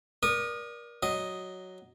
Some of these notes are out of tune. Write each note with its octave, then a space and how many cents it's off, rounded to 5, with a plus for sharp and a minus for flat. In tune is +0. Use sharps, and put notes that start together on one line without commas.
A#4 +30 D5 +0 D#6 -20
F#3 +5 D#5 +0